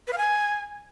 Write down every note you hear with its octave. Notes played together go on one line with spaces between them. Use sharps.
B4
F5
G#5